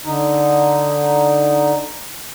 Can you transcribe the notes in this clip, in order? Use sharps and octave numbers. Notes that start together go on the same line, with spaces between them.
D3 D#4